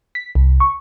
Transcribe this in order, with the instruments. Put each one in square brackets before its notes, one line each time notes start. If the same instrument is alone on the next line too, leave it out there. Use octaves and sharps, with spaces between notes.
[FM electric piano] B6
C2
C#6